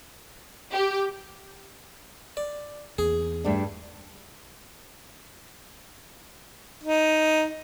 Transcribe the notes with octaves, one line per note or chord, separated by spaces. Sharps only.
G4
D5
E2 A#3 C4 G#4
G2 A3 D4
D#4